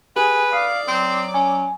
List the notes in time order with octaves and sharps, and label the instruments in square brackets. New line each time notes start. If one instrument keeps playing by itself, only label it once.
[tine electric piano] G4 [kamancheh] G#4 [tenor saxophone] B4
[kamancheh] D5 D6 [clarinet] F5 [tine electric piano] D#6
[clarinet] F#3 [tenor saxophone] C4
[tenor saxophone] C#4 [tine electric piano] G#5